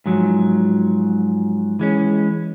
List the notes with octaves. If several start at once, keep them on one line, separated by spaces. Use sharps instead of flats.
G#2 F3 F#3
E3 G#3 C#4